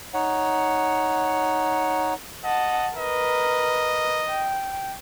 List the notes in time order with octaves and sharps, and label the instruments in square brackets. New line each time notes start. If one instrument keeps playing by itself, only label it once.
[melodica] D#4 C#5 F#5
[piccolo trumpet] D#5 [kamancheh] F#5 A5
[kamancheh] A#4 B4 [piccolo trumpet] D#5
[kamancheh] G5